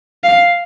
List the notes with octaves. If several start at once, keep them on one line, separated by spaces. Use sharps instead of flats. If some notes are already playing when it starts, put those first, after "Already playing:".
F5